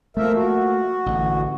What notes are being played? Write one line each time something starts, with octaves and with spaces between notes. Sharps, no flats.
F3 A3 A#3 A#4 E5
F#4
A1 D3 E3